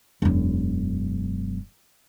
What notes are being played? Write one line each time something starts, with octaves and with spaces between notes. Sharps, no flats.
E1 F#2